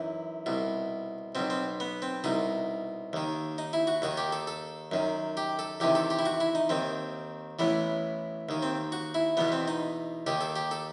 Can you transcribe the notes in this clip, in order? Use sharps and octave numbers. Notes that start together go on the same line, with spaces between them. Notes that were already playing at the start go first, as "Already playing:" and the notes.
Already playing: F#2 E3 D#4
C2 B2
B1 B2 C4
C4
B3
C4
C2 B2 D#4
D#2 D#3
D#4
E4
F#4
D#2 D#3 F#4
G4
A4
A4
F#2 D#3
G4
A4
E2 C3 D#3 G4
A4
G4
E4
F#4
E4
D#4
D#2 D#3 C4
A1 A2 E3 B3
D#2 D#3
C4
F#4
E4
E2 B2 B3
C4
D#4
D#2 D#3 G4
A4
G4
A4